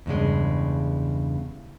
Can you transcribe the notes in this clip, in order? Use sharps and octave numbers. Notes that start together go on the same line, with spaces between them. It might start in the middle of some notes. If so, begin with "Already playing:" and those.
E2 G2 C#3 G#3